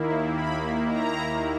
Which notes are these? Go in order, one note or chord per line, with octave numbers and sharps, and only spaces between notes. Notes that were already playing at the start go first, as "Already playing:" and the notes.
Already playing: D#2 D#3 A#3 E4
B5
A#5